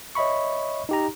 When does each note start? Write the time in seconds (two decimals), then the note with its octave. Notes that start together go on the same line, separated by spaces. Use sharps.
0.15 C#5 D#5 E5 B5 C#6
0.89 D#4 G4 A#5